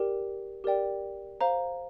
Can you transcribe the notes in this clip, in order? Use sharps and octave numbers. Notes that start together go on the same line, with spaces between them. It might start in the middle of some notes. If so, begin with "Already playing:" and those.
Already playing: G4 A#4 D5 G5
G4 A#4 D5 G5
C5 F5 A#5